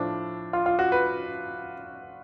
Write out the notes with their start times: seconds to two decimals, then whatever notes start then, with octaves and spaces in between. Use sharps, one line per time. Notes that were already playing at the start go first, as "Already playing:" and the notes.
Already playing: A2 F3 D4
0.53 F4
0.66 F4
0.79 F#4
0.92 B4